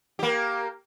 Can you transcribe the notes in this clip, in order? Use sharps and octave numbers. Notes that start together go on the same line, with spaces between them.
A#3 G4